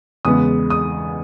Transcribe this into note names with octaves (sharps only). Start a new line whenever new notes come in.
E2 C#3 G#3 B3 D#6
D#6